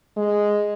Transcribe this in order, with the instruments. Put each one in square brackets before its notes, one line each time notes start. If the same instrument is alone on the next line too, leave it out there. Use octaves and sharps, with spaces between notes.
[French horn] G#3